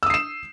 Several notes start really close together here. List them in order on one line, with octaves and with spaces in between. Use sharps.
E6 D#6 C7 E7